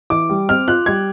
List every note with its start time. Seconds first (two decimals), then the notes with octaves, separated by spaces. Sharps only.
0.10 E3 D6
0.29 G3
0.49 C4 F6
0.68 F4 F#6
0.86 G3 G#6